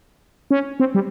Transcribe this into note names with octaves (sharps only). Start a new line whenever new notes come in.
C#4
C4
G3